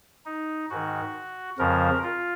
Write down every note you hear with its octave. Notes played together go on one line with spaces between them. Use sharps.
D#4
G#2 D#3 F#4
F2 C#3 F3 A#4
F4